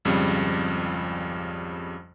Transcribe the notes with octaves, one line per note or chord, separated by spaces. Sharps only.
G#1 F2 C#3 G3